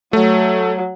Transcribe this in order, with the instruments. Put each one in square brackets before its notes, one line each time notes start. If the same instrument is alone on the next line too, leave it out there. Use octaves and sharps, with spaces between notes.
[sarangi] F#3 [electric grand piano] A3